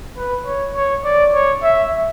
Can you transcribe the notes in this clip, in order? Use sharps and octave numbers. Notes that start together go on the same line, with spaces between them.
B4
C#5
C#5
D5
C#5
E5